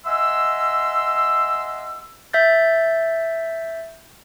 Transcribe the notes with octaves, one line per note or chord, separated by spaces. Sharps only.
D#5 E5 F#5 G#5 C6 E6
E5 G6 A6